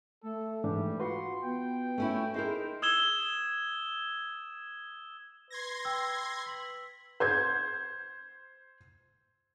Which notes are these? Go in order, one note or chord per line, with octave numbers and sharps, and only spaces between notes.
A3 A4
G#2 E3 G3 D4
F4 F#4 B4 F#5 C6
B3 G5
A3 C#4 E4
D#4 E4 G#4 A#4 C5
D#6 E6 G#6 E7 G7
B4 C6 G#6 A#6
G5 E6
B6 F#7
C5 G6 G#6